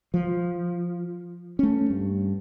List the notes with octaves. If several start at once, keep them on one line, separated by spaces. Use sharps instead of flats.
F3
A3 C#4
G2